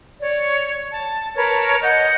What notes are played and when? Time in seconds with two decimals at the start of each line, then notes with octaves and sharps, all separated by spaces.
0.20 C#5 D5
0.91 A5
1.35 A#4 B4 C#5 A5
1.82 D#5 F#5 G6